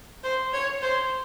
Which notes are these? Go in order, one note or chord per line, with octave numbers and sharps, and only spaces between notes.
C5
C#5
C5